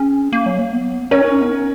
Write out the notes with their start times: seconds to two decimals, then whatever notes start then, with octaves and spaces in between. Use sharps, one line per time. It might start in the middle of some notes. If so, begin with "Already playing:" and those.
Already playing: C#4 G#4
0.33 A#3
0.46 F#3
0.59 A#3
0.72 B3
1.11 C#4 A#4 C#5
1.21 D#4
1.32 C#4
1.41 B3
1.51 C#4